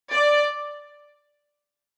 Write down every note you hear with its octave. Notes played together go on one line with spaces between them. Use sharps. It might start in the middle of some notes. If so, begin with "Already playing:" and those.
D5